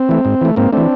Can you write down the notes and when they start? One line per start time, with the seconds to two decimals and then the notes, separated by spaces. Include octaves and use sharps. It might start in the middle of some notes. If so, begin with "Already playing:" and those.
Already playing: C4
0.09 E3 A3
0.25 G#2
0.41 E3 A3
0.56 G#2 A#3 C4
0.72 E3 A3 C4 D4